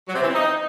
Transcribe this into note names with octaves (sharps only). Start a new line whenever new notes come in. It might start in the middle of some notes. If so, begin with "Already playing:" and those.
F#3
C3
E3
C4
D#4